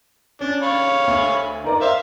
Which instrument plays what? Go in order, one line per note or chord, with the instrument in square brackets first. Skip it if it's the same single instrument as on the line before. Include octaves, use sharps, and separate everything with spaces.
[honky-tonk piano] C#4 [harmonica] D4
[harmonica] C#5 F5 B5
[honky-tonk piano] D2
D#4 A#4 D5
[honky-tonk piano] C5 [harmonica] E5 F5